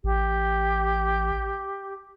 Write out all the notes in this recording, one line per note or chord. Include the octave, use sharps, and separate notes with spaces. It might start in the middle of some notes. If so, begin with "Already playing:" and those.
A1 G4